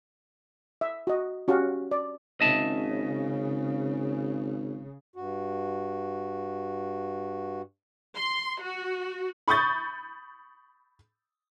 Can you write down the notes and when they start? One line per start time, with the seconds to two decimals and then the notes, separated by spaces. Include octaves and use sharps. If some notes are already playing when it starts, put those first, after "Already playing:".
0.81 E5
1.07 F#4 D#5
1.48 C#4 F#4 G4 F5
1.91 D5
2.41 G#1 C#3 D#5 E5 A5
5.16 G2 F#4
8.15 C6
8.62 F#4
9.48 B5 C#6 D#6 G6 A6